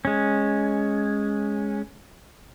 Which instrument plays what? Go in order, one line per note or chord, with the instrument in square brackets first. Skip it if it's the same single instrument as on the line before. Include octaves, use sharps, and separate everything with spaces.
[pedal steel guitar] G#3 C#4